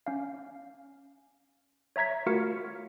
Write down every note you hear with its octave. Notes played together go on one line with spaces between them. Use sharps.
C#4 F5
C#5 E5 A#5 G#6 B6
A3 F4 F#4 A#4 F5 C#7